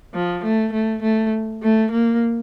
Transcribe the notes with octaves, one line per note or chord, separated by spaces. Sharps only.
F3
A3
A3
A3
A3
A#3